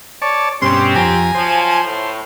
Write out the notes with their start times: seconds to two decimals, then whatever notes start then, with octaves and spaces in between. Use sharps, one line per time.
0.22 C#5 D5 A5
0.62 G2 B2 C4 C#4 G4 C6
0.96 F2 G#5 A#5
1.34 F3 F#3 C5
1.84 A2